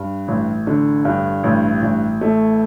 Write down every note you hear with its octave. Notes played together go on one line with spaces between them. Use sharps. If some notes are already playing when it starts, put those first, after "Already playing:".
Already playing: G2
A1
D3
G2
A1
A1
A3